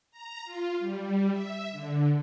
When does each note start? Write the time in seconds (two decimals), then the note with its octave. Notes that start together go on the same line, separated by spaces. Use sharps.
0.11 A#5
0.44 F4
0.79 G3
1.30 E5
1.72 D3